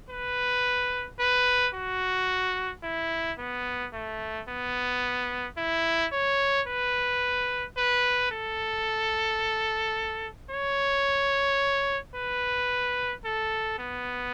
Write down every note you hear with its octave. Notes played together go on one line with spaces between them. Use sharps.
B4
B4
F#4
E4
B3
A3
B3
E4
C#5
B4
B4
A4
C#5
B4
A4
B3